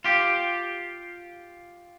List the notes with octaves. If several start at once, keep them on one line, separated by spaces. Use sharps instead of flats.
F4 G4